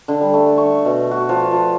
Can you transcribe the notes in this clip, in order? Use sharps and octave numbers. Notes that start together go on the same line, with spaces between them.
D3
G3
A3
C#6
B2
F#4
F3
F3